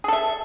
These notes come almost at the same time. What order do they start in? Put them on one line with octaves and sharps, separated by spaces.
G#4 A4 E5